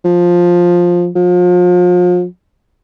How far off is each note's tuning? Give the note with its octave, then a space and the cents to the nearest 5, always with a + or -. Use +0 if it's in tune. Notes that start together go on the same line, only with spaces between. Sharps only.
F3 +10
F3 +35